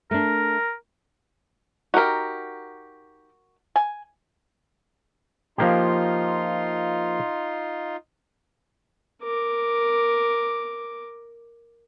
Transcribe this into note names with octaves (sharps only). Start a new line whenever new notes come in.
A3 D4 A#4
D#4 F#4 G4 A#4
G#5
F3 A#3 D#4 F4 G4 C6
A#4 D6